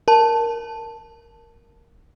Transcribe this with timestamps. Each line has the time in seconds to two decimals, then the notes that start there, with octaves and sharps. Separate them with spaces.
0.08 A#4 A5